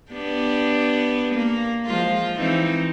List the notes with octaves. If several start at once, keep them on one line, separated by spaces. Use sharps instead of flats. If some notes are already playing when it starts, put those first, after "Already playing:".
B3 D4 G4
A#3
F3 G#3 F4
E3 C4 D#4